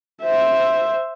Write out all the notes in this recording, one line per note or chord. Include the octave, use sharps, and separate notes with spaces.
C5 E5